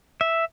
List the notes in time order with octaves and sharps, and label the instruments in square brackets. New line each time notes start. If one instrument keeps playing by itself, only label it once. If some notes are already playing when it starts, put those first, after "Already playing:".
[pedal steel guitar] E5